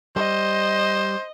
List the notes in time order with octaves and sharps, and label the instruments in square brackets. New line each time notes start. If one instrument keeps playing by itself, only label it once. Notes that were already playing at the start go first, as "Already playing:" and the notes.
[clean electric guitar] G3 [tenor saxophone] C5 [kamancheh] D#5